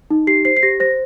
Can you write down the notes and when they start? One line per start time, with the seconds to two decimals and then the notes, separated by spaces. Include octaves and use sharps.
0.11 D#4
0.27 G4 C7
0.45 C5 C7
0.57 C7
0.63 G4 A#6
0.80 C5 A#6